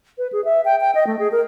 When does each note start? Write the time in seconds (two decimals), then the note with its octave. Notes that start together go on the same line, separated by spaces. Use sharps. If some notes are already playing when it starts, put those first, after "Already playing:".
0.18 B4
0.32 G#4
0.45 E5
0.65 G5
0.81 G5
0.95 D#5
1.07 A3
1.19 G#4
1.32 A#4